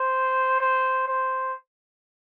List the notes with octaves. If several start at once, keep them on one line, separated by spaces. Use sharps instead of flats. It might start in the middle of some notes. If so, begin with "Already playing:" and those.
Already playing: C5
C5
C5